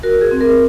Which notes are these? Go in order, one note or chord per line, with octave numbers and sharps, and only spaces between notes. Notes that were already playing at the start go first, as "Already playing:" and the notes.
F#4 A#4
G#4
C4
A#4